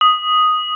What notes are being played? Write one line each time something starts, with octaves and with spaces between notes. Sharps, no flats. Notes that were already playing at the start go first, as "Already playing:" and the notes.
D#6